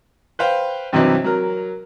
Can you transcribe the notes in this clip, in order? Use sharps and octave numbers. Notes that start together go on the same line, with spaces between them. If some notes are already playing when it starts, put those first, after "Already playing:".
B4 C5 F5 G5
G2 C3 E3 F#3 C4 D#4
F#3 A#4